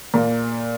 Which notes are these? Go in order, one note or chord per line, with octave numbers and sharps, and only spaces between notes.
A#2 A#3